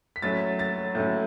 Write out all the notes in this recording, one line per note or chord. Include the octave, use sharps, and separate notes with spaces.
B6
A2 F#3 C#4 A6
A6
A2 F#3 C#4